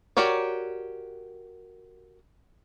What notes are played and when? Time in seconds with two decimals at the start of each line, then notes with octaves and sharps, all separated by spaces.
0.17 F#4 G4 A#4 C#5 D5